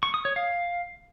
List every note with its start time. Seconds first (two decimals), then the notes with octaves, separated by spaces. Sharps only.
0.03 C#6
0.14 D#6
0.25 C#5
0.36 F5